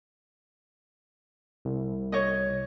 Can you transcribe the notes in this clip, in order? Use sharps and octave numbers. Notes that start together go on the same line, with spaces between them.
C2
C#5 D#5